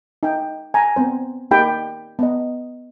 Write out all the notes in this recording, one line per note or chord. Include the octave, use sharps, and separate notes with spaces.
D#4 G5
G#5 A#5
B3 C4 C5
A#3 D#4 G4 G5 B5
B3 D#5